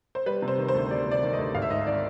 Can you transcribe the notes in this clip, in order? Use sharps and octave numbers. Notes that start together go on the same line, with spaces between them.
C5
G3 B4
C3
C5
D#3
C5
D2
G3 D5
C3
D5
D#3
D#5
D2
G#1 F5
E5
G#2 D#5
D#3 D5